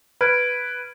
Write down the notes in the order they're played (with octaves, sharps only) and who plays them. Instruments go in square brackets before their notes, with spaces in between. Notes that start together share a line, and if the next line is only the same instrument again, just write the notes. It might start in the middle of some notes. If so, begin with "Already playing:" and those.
[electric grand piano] B4 [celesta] F6 G#6 D7